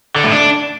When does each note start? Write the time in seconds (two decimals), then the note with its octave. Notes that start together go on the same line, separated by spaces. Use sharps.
0.16 D3
0.24 A2
0.32 D4